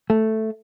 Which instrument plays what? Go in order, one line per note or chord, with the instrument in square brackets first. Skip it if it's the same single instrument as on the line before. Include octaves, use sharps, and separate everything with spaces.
[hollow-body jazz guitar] A3